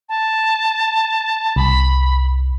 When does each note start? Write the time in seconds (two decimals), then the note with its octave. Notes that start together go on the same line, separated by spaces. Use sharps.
0.09 A5
1.56 C2 B5